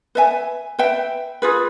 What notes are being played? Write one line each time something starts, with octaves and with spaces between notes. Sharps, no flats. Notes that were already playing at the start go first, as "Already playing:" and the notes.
B4 E5 G#5
B4 E5 G5
F4 G#4 B4